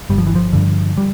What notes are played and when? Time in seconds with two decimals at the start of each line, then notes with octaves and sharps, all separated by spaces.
0.10 G1 G3
0.18 F3
0.27 E3
0.35 F3
0.53 G2 D3
0.98 G3